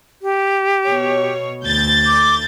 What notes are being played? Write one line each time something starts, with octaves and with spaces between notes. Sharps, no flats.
G4
B2 C#5
D2 G6 A6
D6